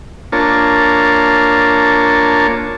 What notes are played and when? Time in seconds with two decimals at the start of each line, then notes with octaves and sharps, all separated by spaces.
0.32 A#3 D4 F4 A#4 C#5 A5